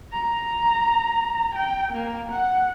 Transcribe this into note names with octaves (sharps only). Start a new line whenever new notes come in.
A#5
G5
A#3
F#5